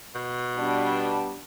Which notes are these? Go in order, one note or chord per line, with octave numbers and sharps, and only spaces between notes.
B2
G3 B3 D4